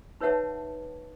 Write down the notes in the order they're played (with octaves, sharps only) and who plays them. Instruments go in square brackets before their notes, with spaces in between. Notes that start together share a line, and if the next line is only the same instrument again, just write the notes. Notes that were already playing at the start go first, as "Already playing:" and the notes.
[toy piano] D#4 B4 C#5 E5 F#5 A5